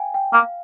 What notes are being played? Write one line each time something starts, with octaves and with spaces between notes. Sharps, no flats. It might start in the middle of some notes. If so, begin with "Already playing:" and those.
Already playing: F5 G5 G#5
G5
A#3 F5